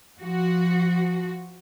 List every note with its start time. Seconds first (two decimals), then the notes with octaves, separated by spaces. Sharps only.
0.20 F3 F#4